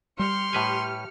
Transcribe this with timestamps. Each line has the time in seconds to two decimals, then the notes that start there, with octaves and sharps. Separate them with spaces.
0.19 G3 G4 C6 F6 C#7
0.53 A2 B4 G#5